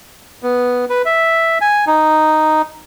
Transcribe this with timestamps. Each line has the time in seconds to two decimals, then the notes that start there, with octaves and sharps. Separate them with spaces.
0.43 B3
0.90 B4
1.05 E5
1.61 G#5
1.87 D#4